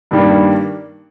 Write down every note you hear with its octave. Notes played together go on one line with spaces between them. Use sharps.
G2 D#3 G3 A#3 D4